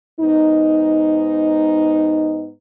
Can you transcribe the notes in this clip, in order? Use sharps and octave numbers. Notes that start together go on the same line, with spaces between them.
G#2 B3 D#4